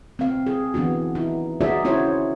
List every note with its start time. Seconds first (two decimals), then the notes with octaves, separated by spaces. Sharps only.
0.19 C4 F5
0.46 G#4
0.74 E3 B3 D4 F#4
1.15 D#4 E4
1.61 D#4 F#4 G#4 D5 E5
1.85 C#4 E4 F#4 C5 C#5